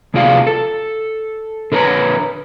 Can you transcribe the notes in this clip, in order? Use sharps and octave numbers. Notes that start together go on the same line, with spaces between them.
D2 C3 F4 G#4 D5 F5
A4
D3 A#4 B4 C#5 A#5